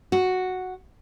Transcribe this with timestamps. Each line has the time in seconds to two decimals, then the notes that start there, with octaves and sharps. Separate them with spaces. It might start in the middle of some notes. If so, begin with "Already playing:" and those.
0.12 F#4